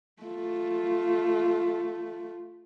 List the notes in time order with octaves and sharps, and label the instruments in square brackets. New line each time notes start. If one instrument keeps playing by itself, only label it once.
[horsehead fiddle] A3 F4